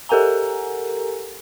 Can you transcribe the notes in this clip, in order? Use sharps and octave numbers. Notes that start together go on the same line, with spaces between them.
G4 A4 A#4 F#5 G#5 A#5